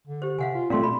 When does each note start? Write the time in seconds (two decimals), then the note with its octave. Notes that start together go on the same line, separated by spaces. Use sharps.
0.08 D3
0.22 G4 C5
0.39 C3 F5 F#5 G#5
0.55 F4
0.70 A#2 A3 C4 D4 F5 C6
0.83 B2 B5